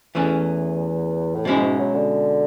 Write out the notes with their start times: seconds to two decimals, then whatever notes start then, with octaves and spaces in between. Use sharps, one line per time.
0.15 E2 E3 A3 C#4 G#4
1.35 A2
1.45 G#2 B2 G#3 C#4 E4 G#4
1.62 G#2
1.79 F#3
1.95 D3